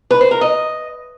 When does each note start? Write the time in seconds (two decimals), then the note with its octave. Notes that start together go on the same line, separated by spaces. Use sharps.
0.11 B4
0.21 C5
0.31 A#4
0.41 D#5